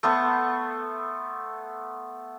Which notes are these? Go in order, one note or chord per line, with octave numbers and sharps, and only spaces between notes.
A3 B3 C5 C#6